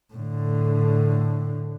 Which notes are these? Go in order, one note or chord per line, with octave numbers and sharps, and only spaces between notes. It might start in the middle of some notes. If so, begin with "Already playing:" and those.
A2 D3